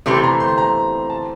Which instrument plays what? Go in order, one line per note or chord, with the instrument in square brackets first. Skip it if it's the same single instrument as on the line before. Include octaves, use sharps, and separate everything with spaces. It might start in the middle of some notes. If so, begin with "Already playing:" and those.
[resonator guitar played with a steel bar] C3 E3 A3 C4 G4 [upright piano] C6
[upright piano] A#5
C6
A#5
A5